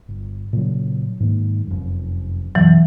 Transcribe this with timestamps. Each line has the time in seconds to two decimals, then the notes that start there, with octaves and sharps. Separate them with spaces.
0.08 G1
0.53 A#2 C#3 F#3
1.20 G#2 D#3 A#3
1.67 F1 F#2
2.55 F#2 B2 E3 F#3